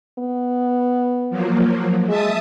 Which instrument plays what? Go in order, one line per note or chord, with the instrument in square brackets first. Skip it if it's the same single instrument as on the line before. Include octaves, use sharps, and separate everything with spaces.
[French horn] B3
[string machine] F3 F#3 A#3
[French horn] G#3 [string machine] E5 A5 D#6